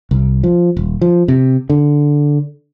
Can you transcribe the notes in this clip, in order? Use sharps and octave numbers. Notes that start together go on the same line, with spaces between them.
C2
F3
D#1
F3
C3
D3